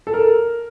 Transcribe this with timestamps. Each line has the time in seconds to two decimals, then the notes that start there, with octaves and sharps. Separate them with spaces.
0.07 A4
0.14 A#4